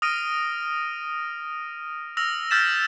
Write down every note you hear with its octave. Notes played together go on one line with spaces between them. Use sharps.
D#6 F6 A#6 D7 D#7
E6 F6 A#6 F7
E6 F6 G6 A6 B6 E7